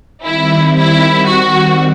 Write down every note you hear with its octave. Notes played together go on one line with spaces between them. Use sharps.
D#3 G3 C4 E4
E4
F#4